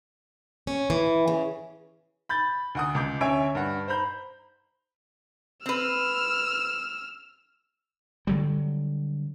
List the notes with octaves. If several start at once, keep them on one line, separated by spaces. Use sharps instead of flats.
C#4
E3
C#3
B5 G6 A6
D2 F#5 D#6
C#2 D6 G6
D2 C#4 C#5 E5 G#5 D7
G2 F#5
C5 A#5 B5 G6
C4 B4 E6 F6
D3 F#3 G3